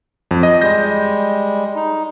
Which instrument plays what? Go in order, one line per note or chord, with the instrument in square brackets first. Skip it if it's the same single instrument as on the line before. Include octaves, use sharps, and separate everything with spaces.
[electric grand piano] F2
D#5
[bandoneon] G3 G#3 [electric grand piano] G6 A#6
[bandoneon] D#4